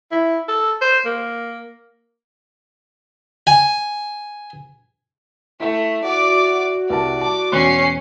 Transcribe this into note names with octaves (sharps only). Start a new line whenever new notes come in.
E4
A4
C5
A#3
G#5
A3 E4 E5
F#4 D5 D6
C2 A#4 D5 A5
A5 D6
E1 C#4 C6 F#6 C7